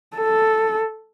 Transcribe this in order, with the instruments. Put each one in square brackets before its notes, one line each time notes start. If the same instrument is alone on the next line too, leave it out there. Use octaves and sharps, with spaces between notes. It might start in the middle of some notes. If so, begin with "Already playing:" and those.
[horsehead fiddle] A4